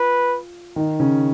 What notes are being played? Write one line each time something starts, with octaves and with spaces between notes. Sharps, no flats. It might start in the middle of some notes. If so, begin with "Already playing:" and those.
Already playing: F4 B4
D#3 D#4
C#3 C#4